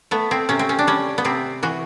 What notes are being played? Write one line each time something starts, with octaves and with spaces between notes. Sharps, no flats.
A3 B3
C4
C3 C#4
C4
C#4
D4
G3 C#4
B3
C3 C4
E3 F#4